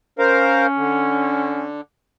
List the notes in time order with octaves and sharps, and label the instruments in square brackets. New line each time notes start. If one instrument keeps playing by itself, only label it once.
[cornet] C#4 [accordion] A#4 C5 F5
[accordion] D3